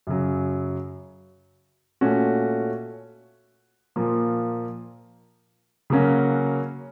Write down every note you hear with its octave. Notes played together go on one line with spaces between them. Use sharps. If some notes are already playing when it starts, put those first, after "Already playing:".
F#2 C#3 F#3
A#2 A3 C#4 F#4
A#2 F3 A#3
C#3 F#3 A#3 C#4 F#4